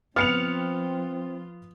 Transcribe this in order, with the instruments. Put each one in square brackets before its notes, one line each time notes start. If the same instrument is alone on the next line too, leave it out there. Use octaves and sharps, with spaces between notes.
[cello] F3 F4 [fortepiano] B3 [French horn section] C4 [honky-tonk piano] F6 C#7 F7